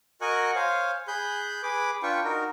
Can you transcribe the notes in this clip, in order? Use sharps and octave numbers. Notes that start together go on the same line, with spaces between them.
F#4 A#4 D#5 G#5 C#6 F#6
C5 C#5 F5 G#5
G#4 B5 F#6 G6
G#4 B4 B5 D6
D4 F4 B4 G5 C#6
D#4 F#4 A#4